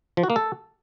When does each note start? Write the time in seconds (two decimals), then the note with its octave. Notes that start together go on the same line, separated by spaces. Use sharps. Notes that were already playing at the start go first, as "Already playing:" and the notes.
0.17 F3
0.23 F#4
0.30 A#3
0.36 A4